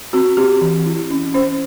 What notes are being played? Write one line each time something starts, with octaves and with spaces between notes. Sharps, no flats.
C4 F#4
C4 G4
E3
E4
C#4
C#4 C5